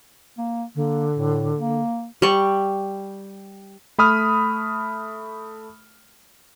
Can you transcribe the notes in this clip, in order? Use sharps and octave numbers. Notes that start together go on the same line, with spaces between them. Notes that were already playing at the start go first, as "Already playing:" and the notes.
A#3
D3 A#3
A2
A#3
G3 C#6
A3 B5 D#6 F6